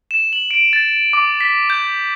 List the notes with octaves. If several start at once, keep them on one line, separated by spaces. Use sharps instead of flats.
E7
F#7
D7
A6
D6
B6
G6